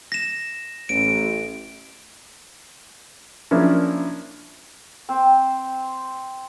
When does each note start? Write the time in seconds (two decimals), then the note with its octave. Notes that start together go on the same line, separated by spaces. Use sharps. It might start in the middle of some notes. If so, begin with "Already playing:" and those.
0.12 A#6 E7
0.89 A1 D7
3.51 F3 A#3 C#4 D4 E4
5.09 C4